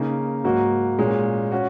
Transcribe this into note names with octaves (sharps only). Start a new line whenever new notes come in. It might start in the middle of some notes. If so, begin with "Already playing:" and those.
Already playing: C#3 A#3 D#4
G#2 F#3 A#3 F#4
A#2 G#3 C#4
C#4 F#4